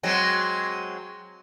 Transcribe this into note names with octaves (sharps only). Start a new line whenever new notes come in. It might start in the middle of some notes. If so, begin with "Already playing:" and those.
F#3 G#3 C4